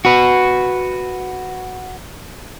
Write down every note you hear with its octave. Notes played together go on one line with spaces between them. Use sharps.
F#4 B4